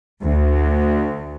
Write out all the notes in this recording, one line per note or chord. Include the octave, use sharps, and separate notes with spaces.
D2